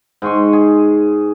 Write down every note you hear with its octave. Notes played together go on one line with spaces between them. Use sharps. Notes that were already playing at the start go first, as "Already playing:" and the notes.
G#2 G#5 C6 C#6
G#4